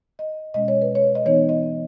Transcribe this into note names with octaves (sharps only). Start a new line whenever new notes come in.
D#5
B2 G#3 C#4 D#5
C#5
B4
C#5
D#5
E3 B3 D#4 C#5
D#5